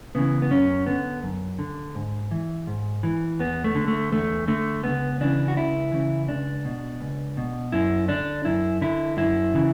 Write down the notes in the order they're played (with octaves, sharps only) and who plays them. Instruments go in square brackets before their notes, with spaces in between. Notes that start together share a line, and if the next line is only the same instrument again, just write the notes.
[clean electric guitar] C#3 E3 B3
B3
F#2 C#4
D3 B3
F#2
D3
G#2
E3
G#2
E3
E2 B3
A3
D3
A3
E2 A3
D3 A3
C#2 B3
C#3 E3 D4
F#4
C#2 E4
C#3 E3
C#2 D4
B2
C#2
B2
F#2 E4
D3 D4
F#2 E4
D3 E4
F#2 E4
C#3 E3